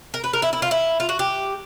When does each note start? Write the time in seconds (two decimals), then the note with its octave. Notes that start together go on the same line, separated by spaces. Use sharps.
0.14 A#4
0.24 B4
0.33 A#4
0.42 E4
0.53 E4
0.62 F4
0.71 E4
1.00 F4
1.09 F#4
1.19 G4